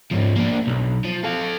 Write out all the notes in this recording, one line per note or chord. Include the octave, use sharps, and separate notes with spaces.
G#2 F3
A#3 D4
B1
F3
A4 F5